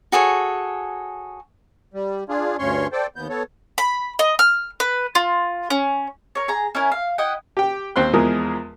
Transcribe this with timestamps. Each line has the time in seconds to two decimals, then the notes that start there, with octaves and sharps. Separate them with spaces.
0.12 F#4 G#4 A4 C#5
1.94 G3
2.29 D4 F4 G#4
2.59 D2 G2 C#4 C#5 C6 C#6
2.92 A4 C5 D5 G5
3.16 D#2 B3 G6
3.29 B3 A4 C#5
3.78 B5
4.19 D#5
4.39 F6
4.80 B4
5.15 F4
5.70 C#4
6.35 A#4 C#5
6.48 G#4 A#5
6.75 C#4 E4 A#4
6.92 F5
7.18 E4 D#5 F#5 G5
7.57 G4 G5
7.96 D#2 C4 C5 C6 F#6
8.13 E2 F3 G#3 G#4 A#4